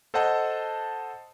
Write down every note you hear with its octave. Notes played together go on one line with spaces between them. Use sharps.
A4 C5 D#5 F#5 A5